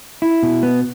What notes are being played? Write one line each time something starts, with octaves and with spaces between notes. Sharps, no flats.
E4
B2
B3